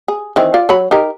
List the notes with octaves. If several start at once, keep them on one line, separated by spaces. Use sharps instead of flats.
G#4
D#3 E3 C4
F4 D5
F#3 C#5 B5
D#4 G4 A#4